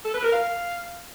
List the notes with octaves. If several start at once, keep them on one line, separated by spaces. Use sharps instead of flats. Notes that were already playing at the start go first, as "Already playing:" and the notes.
A4
B4
A#4
F5